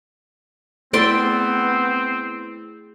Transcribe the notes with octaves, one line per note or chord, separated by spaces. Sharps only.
A3 B3 C4 E4 G#4 D5 G5 C6